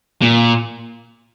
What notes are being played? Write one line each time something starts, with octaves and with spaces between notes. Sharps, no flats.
A#2